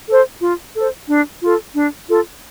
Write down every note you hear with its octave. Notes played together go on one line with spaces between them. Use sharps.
A4 C5
F4
A4 C5
D4
F4 A4
D4
F4 A4